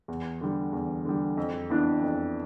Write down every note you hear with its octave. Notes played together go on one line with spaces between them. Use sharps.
E2
D3 G3
E2
D3 G3
F2
E3 B3 D4
F2